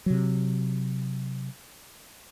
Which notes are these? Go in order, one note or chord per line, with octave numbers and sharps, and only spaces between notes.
C3 F#3